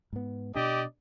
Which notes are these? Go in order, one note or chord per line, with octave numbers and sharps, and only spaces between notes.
G#2 B3
B2 D4 G4 D5 D#5